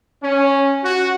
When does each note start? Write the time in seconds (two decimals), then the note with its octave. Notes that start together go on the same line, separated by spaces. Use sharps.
0.23 C#4
0.84 F#4